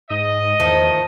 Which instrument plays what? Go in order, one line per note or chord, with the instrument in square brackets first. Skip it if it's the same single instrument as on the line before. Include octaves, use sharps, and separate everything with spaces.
[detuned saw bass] G#2 [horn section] D#5
[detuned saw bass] E2 [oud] D#3 F3 [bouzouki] A3